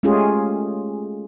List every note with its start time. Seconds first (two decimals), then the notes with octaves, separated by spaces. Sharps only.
0.03 G#3 A3 C#4 F4 G4 G#4